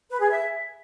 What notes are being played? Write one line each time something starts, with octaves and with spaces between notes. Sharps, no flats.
B4
G#4
E5